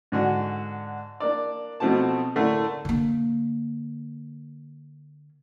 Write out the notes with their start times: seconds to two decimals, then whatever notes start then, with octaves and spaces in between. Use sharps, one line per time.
0.12 G#2 D3 F#4
1.20 A#3 D4 D5
1.80 B2 F3 A3 C4 F#4 A5
2.35 A2 D3 A3 A#3
2.85 D3 A#3